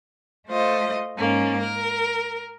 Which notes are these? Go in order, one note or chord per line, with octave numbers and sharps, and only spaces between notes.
A3 F4 C5 D#5
G#2 A#3 C#4
A#4